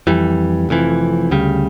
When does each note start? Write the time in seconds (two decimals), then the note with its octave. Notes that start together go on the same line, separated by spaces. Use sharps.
0.07 F2 E3 G3
0.69 F1 F2 E3
1.31 D2 C#3 G3